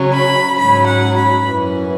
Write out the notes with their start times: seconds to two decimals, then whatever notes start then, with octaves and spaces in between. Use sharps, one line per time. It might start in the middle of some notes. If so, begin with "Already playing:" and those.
Already playing: C#3 F#3 C#4
0.12 B5
0.56 G#2 F#3 C#4 B5
0.86 F#5
1.16 B5
1.45 F#2 E3 C#4